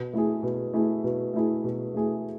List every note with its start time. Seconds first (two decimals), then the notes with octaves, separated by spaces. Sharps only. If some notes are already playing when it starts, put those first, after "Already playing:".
Already playing: B2
0.13 A3 E4 G#4
0.43 B2
0.74 A3 E4 G#4
1.04 B2
1.34 A3 E4 G#4
1.64 B2
1.94 A3 E4 G#4